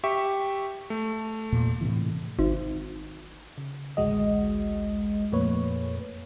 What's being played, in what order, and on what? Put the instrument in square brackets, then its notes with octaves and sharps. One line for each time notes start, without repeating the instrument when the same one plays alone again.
[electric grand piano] G4 E5 C#6
A3
[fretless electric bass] E2 A#2
A2 C3 E3
[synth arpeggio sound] G#1
[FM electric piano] C#3
A1 D2 G#3 F#4 D#5
F2 A#2 A3 A#3 B4 C#5